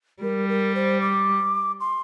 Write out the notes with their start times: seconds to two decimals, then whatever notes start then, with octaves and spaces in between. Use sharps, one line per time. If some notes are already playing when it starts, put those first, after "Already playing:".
0.23 G3 A#4
0.49 A#4
0.75 C5
1.01 D6
1.80 C6